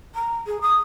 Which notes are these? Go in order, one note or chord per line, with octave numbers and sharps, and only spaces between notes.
A#5
G#4
D#6